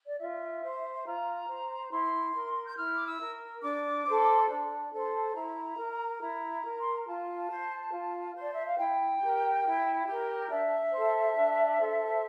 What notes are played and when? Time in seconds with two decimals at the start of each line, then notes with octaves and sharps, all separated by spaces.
0.08 D5
0.19 F4 E5
0.62 C5
1.05 F4 A#5
1.48 C5
1.91 E4 C6
2.34 A#4
2.67 G6
2.77 E4 F6
2.94 D6
3.05 E6
3.19 A#4
3.63 D4 D6
4.06 A4 C5
4.48 D4
4.91 A4 C5
5.34 E4 A#5
5.77 A#4
6.20 E4 A#5
6.63 A#4
6.81 C6
6.93 A#5
7.06 F4 A5
7.49 C5
7.91 F4
8.35 C5
8.40 D5
8.53 E5
8.65 F5
8.78 E4 G5
9.20 G4 A#4
9.63 E4
10.06 G4 A#4
10.49 D4 E5
10.92 A4 C5
11.35 D4
11.78 A4 C5